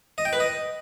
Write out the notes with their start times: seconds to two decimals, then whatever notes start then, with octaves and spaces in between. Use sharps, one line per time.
0.18 D#5
0.25 G5
0.33 B4
0.40 D#5